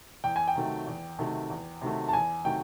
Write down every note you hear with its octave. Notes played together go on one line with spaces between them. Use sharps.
E2 G5
G#5
G5
C3 D#3 F#3 A3
E2
C3 D#3 F#3 A3
E2
C3 D#3 F#3 A3
A5
E2 G#5
C3 D#3 F#3 A3 G5